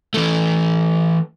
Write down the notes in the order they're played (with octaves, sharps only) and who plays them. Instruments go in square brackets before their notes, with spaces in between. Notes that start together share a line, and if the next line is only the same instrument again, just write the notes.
[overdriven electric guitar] E3 A3